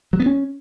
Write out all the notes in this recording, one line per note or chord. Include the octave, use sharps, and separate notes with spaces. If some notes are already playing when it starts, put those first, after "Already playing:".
F#3
B3
C#4